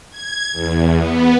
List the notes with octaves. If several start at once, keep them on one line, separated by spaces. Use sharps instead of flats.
G#6
E2
B3